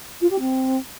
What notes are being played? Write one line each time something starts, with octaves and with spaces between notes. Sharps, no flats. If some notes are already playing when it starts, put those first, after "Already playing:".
F4
G4
C4